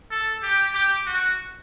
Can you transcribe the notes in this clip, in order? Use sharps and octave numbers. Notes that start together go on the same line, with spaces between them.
A4
G4
G4
F#4